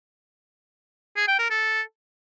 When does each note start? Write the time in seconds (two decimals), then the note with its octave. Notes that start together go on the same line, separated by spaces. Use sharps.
1.17 G#4
1.28 G5
1.39 A#4
1.50 A4